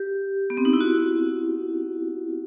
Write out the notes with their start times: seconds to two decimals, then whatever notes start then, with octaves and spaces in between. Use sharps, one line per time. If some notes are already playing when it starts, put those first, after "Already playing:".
Already playing: G4
0.50 B3
0.57 C4
0.65 D#4
0.73 E4
0.81 F#4